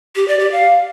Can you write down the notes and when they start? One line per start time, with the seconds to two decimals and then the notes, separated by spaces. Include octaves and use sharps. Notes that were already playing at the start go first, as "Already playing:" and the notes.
0.16 G4
0.28 D5
0.40 G4
0.51 F5